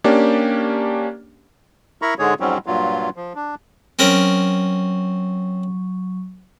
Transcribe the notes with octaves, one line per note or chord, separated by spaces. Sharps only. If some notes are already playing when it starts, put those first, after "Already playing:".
A#3 C#4 D4 G4 D5
E4 A#4 A#5 B5 C#6
G#2 D3 G#3 G#4 C#5
F2 G#2 F#3 G3 C4 C#4
G2 A#2 F#3 F4
F3
D4
F#3 C4 C#4 A#4 C#6